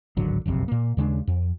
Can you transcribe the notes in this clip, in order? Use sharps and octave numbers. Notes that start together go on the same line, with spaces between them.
D1 G#1 D3 F#3
F#1 B1 F2 C3
A#2 A#3
D#2 C#3 G#3 D4
F2